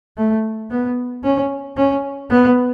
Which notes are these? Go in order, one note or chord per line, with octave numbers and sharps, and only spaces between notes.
A3
B3
C#4
C#4
B3